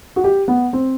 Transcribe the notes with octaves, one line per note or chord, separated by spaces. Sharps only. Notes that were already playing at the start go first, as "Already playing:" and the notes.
F#4
G4
B3
C4